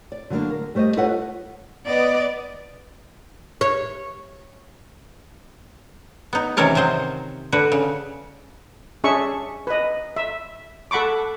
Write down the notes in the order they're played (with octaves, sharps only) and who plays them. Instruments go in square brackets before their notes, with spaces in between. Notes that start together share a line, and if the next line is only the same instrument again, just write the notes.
[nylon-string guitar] D5
D3 F#3 G#3 A#3 D4
A#4
G3 A3 C5 D5 D#5
F4 A4 B4 C#5 D#5 F#5
[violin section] B3 [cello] D5 D#5
[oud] C#5
[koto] B3 D#4
C3 D#3 E3 C#4 A#4 A5
C3 F#3 C5 D#5
D3 F#4 B4
C#3
[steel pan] C#4 D4 G#4 E5 C#6
B4 D#5
E5
A4 F#5 B5 C#6 D6